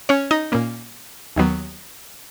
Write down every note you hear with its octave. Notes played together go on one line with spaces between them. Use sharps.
C#4 C#5
D#4 D#5
A#2 A#3 C#4
D#2 D#3 F#3 B3